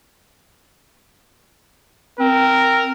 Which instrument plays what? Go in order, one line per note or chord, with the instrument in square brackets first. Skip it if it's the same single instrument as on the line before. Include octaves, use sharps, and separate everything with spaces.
[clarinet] C4 [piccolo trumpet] A#4